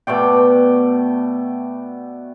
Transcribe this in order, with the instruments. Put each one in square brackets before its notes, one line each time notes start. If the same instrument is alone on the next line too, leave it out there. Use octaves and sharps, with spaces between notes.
[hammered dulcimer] B2 A3 D5 G5